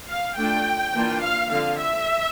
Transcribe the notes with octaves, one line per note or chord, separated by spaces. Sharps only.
F5
A3 D4 F4 G5
E3 A#3 D4 F4
F5
D3 F3 C4 F5
E5